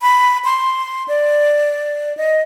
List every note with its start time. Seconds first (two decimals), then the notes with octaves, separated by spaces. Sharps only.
0.01 B5
0.45 C6
1.08 D5
2.17 D#5